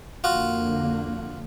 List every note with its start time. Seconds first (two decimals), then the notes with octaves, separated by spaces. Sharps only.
0.24 F2 D3 A#3 F4 F#4